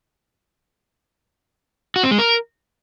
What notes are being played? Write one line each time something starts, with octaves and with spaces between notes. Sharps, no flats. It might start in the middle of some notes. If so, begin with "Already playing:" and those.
F#4
C4
G#3
A#4